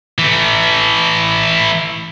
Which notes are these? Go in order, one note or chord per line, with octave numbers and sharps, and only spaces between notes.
E3 A3